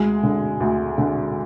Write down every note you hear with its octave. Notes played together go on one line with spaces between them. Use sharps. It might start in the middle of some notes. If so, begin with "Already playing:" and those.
Already playing: D2 G#3
D3
D2
D3